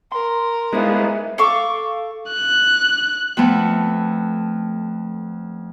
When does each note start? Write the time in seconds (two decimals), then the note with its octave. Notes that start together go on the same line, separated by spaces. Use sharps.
0.12 A#4 C6
0.73 E3 G3 G#3 B3 D#4 C5 F5
1.38 A4 F5 C#6 D6
2.31 F#6
3.37 F2 A3 B3